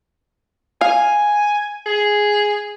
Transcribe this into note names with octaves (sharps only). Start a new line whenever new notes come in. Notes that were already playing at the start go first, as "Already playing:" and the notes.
F5 G#5
G#4